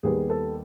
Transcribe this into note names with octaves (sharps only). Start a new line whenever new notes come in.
D#2 D#3 G3 B3 G#4
A4